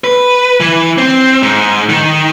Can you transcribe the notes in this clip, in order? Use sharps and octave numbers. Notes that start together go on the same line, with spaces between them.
B4
E3
C4
G#2
D#3